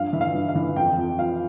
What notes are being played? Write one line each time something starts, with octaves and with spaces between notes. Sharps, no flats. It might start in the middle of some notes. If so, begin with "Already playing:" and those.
Already playing: G2 F3 F5
E3 E5
F5
G2
F5
E3
F2 G5
F2
F3 F5